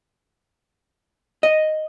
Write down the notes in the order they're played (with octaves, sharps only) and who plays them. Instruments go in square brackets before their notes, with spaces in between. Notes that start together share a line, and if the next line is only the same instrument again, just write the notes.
[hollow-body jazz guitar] D#5